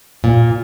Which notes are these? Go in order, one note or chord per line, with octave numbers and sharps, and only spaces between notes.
A#2